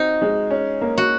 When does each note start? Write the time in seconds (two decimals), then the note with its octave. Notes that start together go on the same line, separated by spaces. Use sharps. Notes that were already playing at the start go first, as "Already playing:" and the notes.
Already playing: C4 D#4 F#4
0.22 G#3
0.51 C#4
0.81 A#3
0.98 F#4